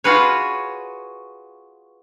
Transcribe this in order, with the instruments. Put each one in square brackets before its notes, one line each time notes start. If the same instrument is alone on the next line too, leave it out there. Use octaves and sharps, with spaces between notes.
[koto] F4 F#4 G#4 B4 C#5